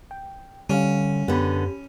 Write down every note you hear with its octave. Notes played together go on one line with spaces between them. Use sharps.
G5
D3 G3 C#4 F5
F#2 D3 B3 G4 B5